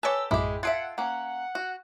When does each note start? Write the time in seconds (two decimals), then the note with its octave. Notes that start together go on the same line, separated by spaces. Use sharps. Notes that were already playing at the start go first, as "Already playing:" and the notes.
0.03 G4 A4 B4 C#5 G#5 E6
0.31 A#1 F#2 A2 G#3 E4 G4
0.63 F4 A4 E5 F#5 G#6 C7 D7
0.98 A#3 C#4 F#5
1.55 F#4